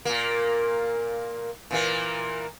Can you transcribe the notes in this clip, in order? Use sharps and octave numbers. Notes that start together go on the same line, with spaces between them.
A#2 A#3
A#2 E3 A#3